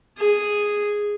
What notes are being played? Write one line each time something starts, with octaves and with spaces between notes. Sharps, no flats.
G#4